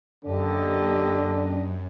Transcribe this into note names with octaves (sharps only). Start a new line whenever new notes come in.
F#2 D3 A#3 D4 G4 D#5